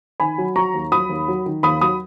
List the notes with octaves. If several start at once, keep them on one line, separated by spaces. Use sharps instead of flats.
D#3 G#5 B5
F#3
F#3 A#5 C#6
D#2
F#3 B5 D#6
D#2
F#3
D#3
D#2 B5 D#6
F#3 B5 D#6